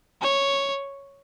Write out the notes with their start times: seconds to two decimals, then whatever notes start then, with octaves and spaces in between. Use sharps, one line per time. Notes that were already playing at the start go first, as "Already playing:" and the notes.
0.21 C#5